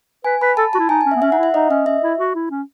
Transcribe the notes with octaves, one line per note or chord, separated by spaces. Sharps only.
B4 G#5
B4 B5
A4 A5
F#4 A5
E4
D#4 G#5
G#5
C#4
E5
B3
C#4 E5
D#4 F#5
E4
E5
D#4 D#5
C#4 D#5
C#4 E5
E4
F#4
E4
C#4